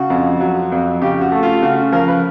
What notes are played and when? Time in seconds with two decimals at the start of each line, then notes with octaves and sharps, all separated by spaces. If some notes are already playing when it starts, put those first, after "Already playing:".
Already playing: C#3 F#4
0.10 F2
0.40 F#3
0.72 F2
1.01 C#3 G4
1.21 F#4
1.32 A3
1.43 F4
1.62 C#3 F#4
1.92 F3 A#4
2.08 B4